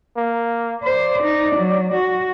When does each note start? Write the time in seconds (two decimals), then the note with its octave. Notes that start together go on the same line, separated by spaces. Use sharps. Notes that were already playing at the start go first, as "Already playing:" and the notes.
0.17 A#3
0.83 C5 D5
1.23 D#4
1.56 F#3
1.94 F#4